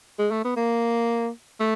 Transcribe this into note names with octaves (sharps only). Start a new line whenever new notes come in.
G#3
A3
B3
A#3
A3